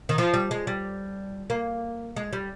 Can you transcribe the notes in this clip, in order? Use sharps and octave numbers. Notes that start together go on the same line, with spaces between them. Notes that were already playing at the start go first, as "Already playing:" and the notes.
D#3
F3
G3
G#3
G3
A#3
G#3
G3